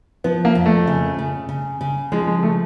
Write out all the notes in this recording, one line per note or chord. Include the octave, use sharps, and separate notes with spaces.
F3 B3
A#3
F2
A3
C#3
C#3
C#3
C#3
F3 G#3
G#3
A3